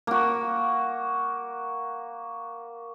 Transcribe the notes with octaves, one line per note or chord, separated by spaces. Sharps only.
A#3 F#4